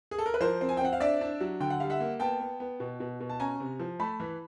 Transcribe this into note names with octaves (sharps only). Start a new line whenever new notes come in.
G#4
A4
A#4
B4
F3 A#4 C5
C4
G#5
G5
C4 F#5
F5
D4 D5 E5
D4
F#3
D3 G5
F#5
G3 F5
E5 F#5
A#3
B3 G5 A5
B3
B3
B2
B2
B2
A5
C#4 G#5 A#5
C3
F3
A3 A5 B5
E3